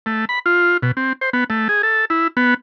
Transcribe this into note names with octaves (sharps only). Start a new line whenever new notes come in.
A3
B5
F4
B2
C4
C5
B3
A3
G#4
A4
E4
B3